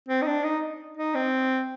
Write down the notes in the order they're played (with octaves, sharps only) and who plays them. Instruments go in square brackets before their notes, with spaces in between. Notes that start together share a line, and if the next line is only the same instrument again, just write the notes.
[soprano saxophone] C4
D#4
D4
D#4
D#4
C4